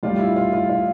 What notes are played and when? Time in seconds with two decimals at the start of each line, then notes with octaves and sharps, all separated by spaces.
0.03 A2 G3 D4 F4
0.19 E4
0.36 F4
0.53 F4
0.70 F4